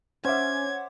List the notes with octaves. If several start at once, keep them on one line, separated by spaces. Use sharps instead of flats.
C#4 C5 C#5 E5 F#5 D6 G#6